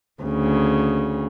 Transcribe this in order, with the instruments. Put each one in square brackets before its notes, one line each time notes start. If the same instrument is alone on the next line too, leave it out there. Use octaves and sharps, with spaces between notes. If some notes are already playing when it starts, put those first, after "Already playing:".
[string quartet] D2 C#3